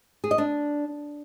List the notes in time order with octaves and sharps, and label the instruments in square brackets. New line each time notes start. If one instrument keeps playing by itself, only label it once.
[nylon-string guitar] G#4
D#5
D4